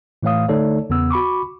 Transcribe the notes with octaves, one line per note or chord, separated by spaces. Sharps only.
A2 E3 A3 C#5 F5 D#6
D3 A3 D#4 A4 C#5 D5
E2 C#3 B3 E6
F#4 B5 C#6 D6